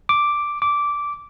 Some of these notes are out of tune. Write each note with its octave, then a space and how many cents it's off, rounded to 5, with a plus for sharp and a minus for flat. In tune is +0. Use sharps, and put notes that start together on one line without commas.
D6 +0
D6 -10